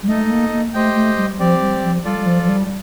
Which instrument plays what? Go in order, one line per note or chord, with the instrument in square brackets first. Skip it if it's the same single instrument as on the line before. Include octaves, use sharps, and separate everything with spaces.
[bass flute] G3
[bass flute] A3 [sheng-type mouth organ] D#4 A4 D#5
[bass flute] A3
A#3
A#3
[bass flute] A3 [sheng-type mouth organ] G4 C5 D#5 G5
[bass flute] A3
G3
[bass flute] F3 [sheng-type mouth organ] C4 G4 D5
[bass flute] G3
F3
[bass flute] G3 [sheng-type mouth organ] F4 A4 D5
[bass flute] G3
F3
F3
G3